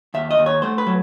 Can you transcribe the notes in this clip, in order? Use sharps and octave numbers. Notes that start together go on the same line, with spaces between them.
D#2 E5
D#5
D#2
C#5
A3 C5
B4
F#3